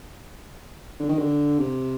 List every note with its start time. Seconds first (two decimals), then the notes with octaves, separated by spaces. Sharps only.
1.00 D3
1.09 D#3
1.18 D3
1.58 C3